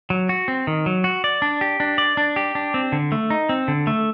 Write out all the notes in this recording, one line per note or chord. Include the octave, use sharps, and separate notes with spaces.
F#3
F#4
C4
D#3
F#3
F#4
D5
D4
G4
D4
D5
D4
G4
D4
C4
D3
A3
D#4
C4
D3
A3